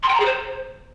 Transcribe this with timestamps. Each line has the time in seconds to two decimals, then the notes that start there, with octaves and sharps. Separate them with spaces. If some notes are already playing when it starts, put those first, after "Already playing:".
0.02 C6
0.08 G5
0.14 A#5
0.19 G#4
0.25 C5